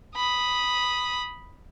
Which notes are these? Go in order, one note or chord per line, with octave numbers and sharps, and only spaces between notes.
B5 D#6